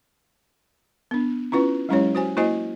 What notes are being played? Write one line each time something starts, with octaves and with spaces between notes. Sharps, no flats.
B3 D4
C#4 E4 F4 B4
F#3 G#3 C#4 E4 G4 C#5
F#4 C5 G#5
A#3 E4 F#4 C5 D#5 G#5